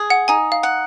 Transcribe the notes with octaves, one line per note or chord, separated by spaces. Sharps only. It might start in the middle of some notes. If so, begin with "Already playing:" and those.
Already playing: G#4
F#5
D#4 G#5
F5
F#5